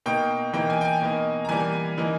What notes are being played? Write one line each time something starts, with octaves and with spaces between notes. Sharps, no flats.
B2 A#3 D#4 G5
E3 A#3 D#4 G5
G#5
G5
G#5
B2 A#3 D#4
A#5
E3 G3 A#3 G#5
E3 A#3 D#4